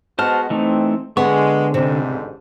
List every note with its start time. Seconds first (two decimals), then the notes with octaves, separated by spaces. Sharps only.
0.19 G#3 B3 F#4 C5 D#5 A5 F6
0.50 E3 A3 C4 D#4
1.17 D3 G#3 B3 C#6
1.74 A1 D2 G#2 C3